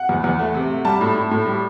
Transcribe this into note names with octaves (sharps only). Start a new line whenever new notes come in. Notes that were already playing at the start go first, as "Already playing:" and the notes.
Already playing: F#5
E2
E2
A3
C3
A3
G3 A5
A2
A2
A2
G3